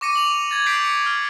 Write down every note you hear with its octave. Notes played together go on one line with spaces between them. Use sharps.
C#6 D6 A#6 C#7 D#7
F7 F#7
G#6 A6
G6 B6 C7 D7 F#7
C#7
F6